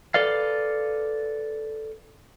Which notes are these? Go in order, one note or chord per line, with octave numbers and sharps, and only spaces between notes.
A4 B4 D5 F5